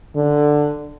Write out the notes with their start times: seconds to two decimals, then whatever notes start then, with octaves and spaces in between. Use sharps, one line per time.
0.16 D3